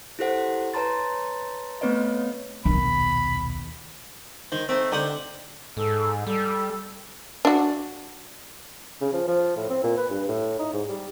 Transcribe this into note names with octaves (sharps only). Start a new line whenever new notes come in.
E4 G4 A4 C5 F#5
B4 C#5 A5 A#5 C6 A6
A3 B3 C4 B4 C#5 D#5
D#1 B1 D#3 B3 B5
D#3 C5
A3 C4 D#4
D3 D#4 G4 C5 F#5
G#2 A4
G3 A4
D4 F#4
C#3
F3
F3
A2
C4
A#2
B4
G2
A2
D#4
G#2
G3